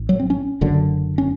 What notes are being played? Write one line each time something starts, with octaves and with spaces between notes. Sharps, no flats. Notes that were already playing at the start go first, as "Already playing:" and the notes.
Already playing: A1
F#3
C4
C#4
F#1 F#2 D3
C#4